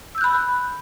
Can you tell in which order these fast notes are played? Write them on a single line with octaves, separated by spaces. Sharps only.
E6 G6 F#6 B5